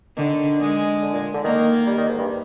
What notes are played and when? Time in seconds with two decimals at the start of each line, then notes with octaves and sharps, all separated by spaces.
0.17 D3 D#3
0.60 G#3
1.02 D3
1.13 A#2
1.34 D3
1.44 D#3 A#3
1.87 G3
1.98 D#3
2.08 G#2
2.19 G2